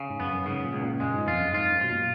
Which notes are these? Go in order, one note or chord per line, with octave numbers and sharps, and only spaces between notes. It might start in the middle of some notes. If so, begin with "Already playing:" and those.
Already playing: C#3
G#2
F#2 B3
F#2
G#2 C#3
A#2
C#2
A#2
F#2 G#3
G#2
F2 F4
F#2
G#2 F4
F#2
B2 F4
A#2